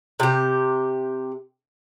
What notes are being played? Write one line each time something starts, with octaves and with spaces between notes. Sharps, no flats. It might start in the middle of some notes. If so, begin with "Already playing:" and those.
C3 G4